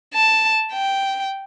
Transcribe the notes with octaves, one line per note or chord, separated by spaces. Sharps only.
A5
G5